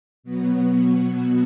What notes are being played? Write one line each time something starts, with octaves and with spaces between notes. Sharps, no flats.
B2 F#3 B3 F#4